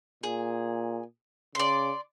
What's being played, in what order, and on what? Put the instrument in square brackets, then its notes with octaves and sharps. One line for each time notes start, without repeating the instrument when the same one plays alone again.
[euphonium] A#2 [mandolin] G#4
[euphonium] C#3 [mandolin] D5 C6